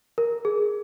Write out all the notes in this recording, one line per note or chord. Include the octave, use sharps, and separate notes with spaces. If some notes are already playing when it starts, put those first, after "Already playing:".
A#4
G#4